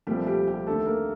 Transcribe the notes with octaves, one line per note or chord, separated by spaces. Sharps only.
C2 A#2 F3 G3 A3 G4
G3 G4
G3 G4
D#2 D3 A3 A4
A#3 A#4